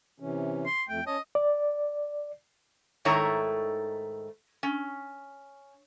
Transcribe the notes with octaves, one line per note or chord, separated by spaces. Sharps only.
C3 E3 C#4
C6
F2 A3 G5
C#4 C#5 D#5 A5
D5
G#2 D#3 A3 E4 C#5 A#5
C#4